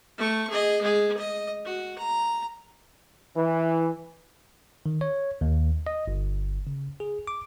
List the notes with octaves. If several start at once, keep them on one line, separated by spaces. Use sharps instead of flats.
A3 C#6
G#4 D#5
G#3 G#4
D#5
F#4
A#5
E3
D#3
C#5
D#2
D#5
G1
C#3
G#4
D6